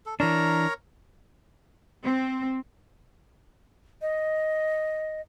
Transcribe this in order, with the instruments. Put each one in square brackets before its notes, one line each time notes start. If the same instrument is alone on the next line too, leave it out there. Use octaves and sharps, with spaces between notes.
[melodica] A4
[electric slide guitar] E3 D4 [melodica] A#4 C#5 A#5
[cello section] C4
[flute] D#5